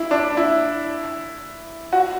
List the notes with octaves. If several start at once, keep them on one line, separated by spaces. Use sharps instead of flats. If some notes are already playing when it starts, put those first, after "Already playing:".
Already playing: E4
D4
E4
F#4